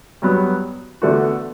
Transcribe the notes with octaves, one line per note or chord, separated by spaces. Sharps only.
G2 F#3 B3
E2 D3 A3 D4 F#4